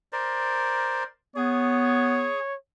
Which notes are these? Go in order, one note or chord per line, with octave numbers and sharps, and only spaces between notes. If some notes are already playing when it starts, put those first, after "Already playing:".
A#4 C5 D5
B3 G#4 C#5